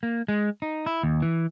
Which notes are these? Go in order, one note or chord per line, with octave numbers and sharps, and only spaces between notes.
A#3
G#3
D#4
E4
D#2
E3